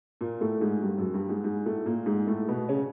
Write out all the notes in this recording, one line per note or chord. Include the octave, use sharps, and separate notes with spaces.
A#2 A#3
A2 A3
G#2 G#3
G2 G3
F#2 F#3
G2 G3
G#2 G#3
G#2 G#3
A2 A3
A#2 A#3
G#2 G#3
A2 A3
B2 B3
C#3 C#4